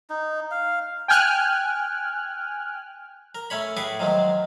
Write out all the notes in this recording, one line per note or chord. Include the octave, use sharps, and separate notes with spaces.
D#4
F5
G5 G#5 F6 F#6
A#4
A3 C#4 C#5 B5
A2 G#4 B4 C#6 D6
D#3 F3 F#3 G#3